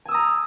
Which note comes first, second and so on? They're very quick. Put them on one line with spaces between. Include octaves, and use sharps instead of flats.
G#5 E6 D#6 A#5